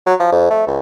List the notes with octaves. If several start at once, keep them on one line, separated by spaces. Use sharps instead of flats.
F#3
F3
F2
A3
C#2